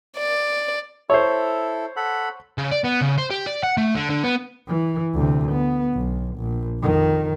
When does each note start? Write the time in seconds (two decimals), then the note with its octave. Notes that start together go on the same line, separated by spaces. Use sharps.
0.17 D5
1.10 E4 A4 C5 C#5
1.96 A4 F#5 B5
2.58 C#3
2.71 D5
2.84 B3
3.01 C#3
3.18 C5
3.30 G4
3.46 D5
3.63 F#5
3.77 A3
3.95 D3
4.10 D3
4.24 B3
4.68 E3
5.14 D2 C3
5.52 B3
5.94 B1
6.37 A#1
6.81 F2 D#3